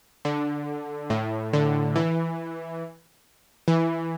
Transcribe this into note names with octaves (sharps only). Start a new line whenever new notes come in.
D3
A2
D3
E3
E3